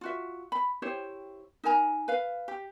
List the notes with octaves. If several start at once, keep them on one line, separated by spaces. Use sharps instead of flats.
F4 F#4 E5
B5
E4 G4 C5 C#5
D#4 A#4 G#5 A#5
B4 F5
G4